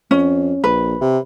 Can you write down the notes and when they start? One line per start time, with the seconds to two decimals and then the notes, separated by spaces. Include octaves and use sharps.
0.11 F2 C#4
0.64 A#1 B4
1.01 C3